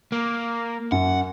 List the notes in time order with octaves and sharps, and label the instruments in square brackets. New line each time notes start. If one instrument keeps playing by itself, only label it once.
[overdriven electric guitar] A#3
[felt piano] F#2 [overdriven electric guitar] F#5